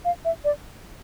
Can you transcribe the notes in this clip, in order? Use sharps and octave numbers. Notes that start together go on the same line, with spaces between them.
F5
E5
D5